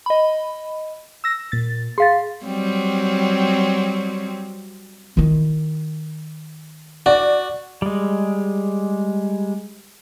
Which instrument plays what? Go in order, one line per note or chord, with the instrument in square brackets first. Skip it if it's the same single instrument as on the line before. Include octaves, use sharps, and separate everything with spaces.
[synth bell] D#5 B5
[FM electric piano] E6 A#6
A#2 A6
[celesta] G#4 F5 A6 [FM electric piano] C6
[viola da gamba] F#3 G3 C4
[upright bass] D#3 E4
[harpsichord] F#4 [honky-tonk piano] D5
[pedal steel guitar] G3 G#3